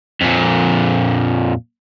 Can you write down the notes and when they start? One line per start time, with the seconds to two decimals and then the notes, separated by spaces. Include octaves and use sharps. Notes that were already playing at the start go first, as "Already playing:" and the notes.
0.21 F2 A#2